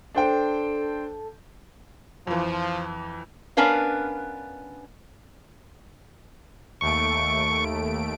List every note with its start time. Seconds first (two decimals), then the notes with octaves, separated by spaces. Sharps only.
0.15 D4 A4 C5 G5
2.27 F2 E3 F3
3.57 B3 C#4 D4 A#4 B4 F5
6.81 D#2 A3 C#6 D7